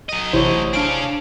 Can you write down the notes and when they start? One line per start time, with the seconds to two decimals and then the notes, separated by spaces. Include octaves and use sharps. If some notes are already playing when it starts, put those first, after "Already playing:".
0.09 F#3 D#5
0.33 A1 C3 E4 C5 C#5
0.73 D4 G#4 F5 D7